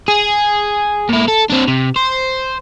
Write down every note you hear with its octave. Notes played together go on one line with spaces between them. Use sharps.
G#4
A#2 E4
A4
C4 D4
C3
C5